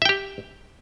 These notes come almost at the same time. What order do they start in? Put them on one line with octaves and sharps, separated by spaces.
E5 G5 G4